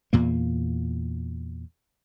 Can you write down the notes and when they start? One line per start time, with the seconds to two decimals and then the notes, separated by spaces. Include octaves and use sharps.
0.13 E2 A#2 A#3